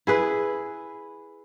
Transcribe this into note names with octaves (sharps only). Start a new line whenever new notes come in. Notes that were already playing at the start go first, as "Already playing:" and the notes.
E4 G#4 B4